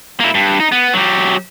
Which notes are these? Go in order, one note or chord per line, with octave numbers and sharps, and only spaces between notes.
A#3 E4
G2
D#4
B3
F#3 G4